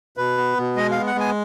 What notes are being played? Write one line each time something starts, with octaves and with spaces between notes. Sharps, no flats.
B2 B4
B3
B2
G#3 D#5
B3 F5
F#5
G#3 G#5